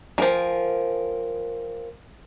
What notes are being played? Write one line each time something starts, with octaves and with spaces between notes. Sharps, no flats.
D#3 F3 A#4 G5 G#5